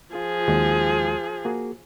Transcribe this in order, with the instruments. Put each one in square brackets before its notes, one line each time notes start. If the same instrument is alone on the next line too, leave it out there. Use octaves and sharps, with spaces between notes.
[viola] F3 G#4 [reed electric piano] F4
[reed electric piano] D#2 G#3 F#4
A#3 F#4 G#4